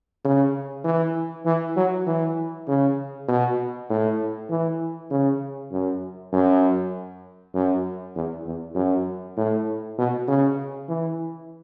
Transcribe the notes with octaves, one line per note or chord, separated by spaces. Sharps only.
C#3
E3
E3
F#3
E3
C#3
B2
A2
E3
C#3
F#2
F#2
F#2
E2
E2
F#2
A2
B2
C#3
E3